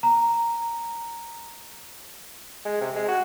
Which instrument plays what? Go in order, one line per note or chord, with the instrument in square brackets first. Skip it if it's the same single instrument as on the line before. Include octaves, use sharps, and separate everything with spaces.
[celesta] A#5
[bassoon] G#3
C3
G#3
F#4